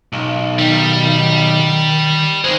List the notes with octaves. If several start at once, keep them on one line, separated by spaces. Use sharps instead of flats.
B1
D#3 G3
D#3 G#3 C5